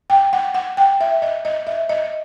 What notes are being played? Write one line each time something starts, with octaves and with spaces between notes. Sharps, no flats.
G5
F#5
F#5
G5
E5
D#5
D#5
E5
D#5